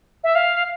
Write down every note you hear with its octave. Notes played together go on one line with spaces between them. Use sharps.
E5
F5